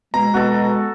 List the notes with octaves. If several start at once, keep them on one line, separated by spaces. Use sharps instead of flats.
B2 G#3 A#5
B2 F#4 A4